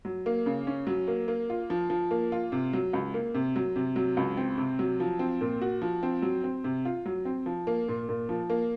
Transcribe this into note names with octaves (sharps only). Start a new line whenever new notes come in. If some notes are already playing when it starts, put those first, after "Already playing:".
F#3
A#3
C#3
C#4
F#3
A#3
A#3
F4
F3
F3
A#3
F4
C3
F#3
C#2
A#3
C3
F#3
C3
F#3
C#2
C4
C3
F#3
F3
C4
A#2
F#4
F3
C4
F#3
C4
C3
F4
F#3
C4
F3
A#3
A#2
A#2
F3
A#3